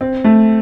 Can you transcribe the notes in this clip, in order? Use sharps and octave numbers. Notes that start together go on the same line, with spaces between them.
C4
A3